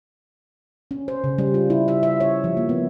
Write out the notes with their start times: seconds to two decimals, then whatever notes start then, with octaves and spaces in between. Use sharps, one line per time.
0.91 C#4
1.08 C5
1.24 C#3
1.38 G3
1.54 F4
1.70 E4
1.88 E5
2.03 E5
2.20 C#5
2.44 F3
2.57 A#3
2.69 B3